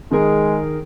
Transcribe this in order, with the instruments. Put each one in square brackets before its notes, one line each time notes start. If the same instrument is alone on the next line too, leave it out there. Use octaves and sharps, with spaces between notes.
[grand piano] D#3 G#4 A#4 [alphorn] G#3